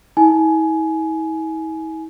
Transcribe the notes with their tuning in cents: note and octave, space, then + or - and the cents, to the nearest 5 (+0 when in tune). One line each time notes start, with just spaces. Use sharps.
E4 -45 G#5 +20